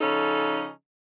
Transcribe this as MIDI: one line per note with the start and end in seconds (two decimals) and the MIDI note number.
0.01 0.69 49
0.01 0.69 53
0.01 0.69 61
0.01 0.69 63
0.01 0.69 69